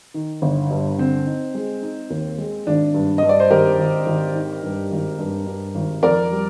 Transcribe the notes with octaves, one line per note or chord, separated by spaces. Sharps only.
D#3
G1
G2
D3 C4
D#4
G#3
D#4
D#2
G#3
G#1 D4
G2
G2 D#5
D5
C5
G#1 G4 A#4
G#1
G#1
D#3
G2
G#1
G2
G2
G#1
F2 A#4 D5
G3